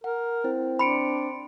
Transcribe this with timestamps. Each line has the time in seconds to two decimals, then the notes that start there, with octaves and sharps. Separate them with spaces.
0.04 A#4 F#5
0.44 C4 E4
0.79 D4 B5 C6 C#7 D7